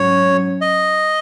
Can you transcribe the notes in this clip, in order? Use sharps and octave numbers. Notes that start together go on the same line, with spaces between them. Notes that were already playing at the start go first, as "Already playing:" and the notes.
Already playing: G#2 F#3 C#4 C#5
D#5